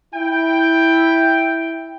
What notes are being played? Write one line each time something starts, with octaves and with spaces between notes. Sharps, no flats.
E4 G5